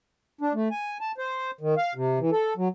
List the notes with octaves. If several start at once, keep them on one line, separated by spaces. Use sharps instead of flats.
D4
A3
G#5
A5
C5
D#3
F5
C3
E3
A4
F#3